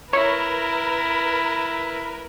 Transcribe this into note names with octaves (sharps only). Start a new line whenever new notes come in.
E4 A#4 B4 C#5